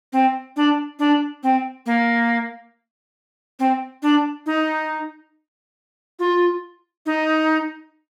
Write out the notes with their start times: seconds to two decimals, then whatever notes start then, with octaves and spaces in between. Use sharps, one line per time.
0.13 C4
0.56 D4
0.99 D4
1.43 C4
1.86 A#3
3.59 C4
4.02 D4
4.46 D#4
6.19 F4
7.06 D#4